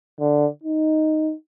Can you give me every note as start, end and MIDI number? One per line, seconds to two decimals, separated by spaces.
0.20 0.46 50
0.63 1.34 63